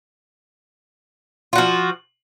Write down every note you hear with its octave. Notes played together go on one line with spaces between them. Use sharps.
F3 F4 F#4